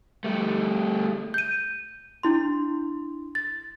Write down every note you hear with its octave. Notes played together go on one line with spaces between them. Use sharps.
G3 A3
G6 D#7
D4 E4 C6
A6